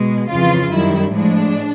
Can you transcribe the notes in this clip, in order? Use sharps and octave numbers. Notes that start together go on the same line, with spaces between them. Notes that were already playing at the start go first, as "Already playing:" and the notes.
Already playing: B2 G#3
F2 C#3 E3 F4
F#2 D#3 G3 E4
A2 F3 G#3 D4